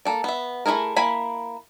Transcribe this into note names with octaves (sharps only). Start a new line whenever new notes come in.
A#3 A4 D5
B3 E5
A3 D#4 E4 G#4 A#4
A#3 E4 G#5 B5